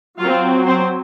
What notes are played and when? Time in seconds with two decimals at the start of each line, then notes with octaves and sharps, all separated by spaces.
0.18 F#3 C4 F4 F5
0.66 C4 C5